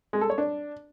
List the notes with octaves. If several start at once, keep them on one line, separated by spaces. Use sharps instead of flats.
G#3
A4
C#5
D4